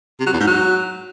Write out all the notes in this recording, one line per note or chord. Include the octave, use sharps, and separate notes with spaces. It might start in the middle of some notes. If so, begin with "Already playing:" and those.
C3
F#3
E2
G#2
F#3